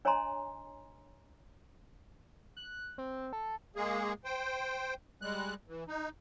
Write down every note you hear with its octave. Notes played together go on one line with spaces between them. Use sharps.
D4 C#5 D#5 G#5 A#5 C6
F#6
C4
A4
G#3 A#3 G#4
C5 G5
G3 G#3 F#6
E3
D#4